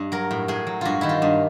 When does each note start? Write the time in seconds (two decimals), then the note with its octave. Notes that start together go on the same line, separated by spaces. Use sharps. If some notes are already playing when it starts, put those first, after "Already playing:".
Already playing: G2
0.12 F#3 A#4
0.31 A2
0.48 A2 G#4
0.67 F#3
0.81 G2 F4 F#4
1.01 D#3 E4
1.09 F4
1.22 G2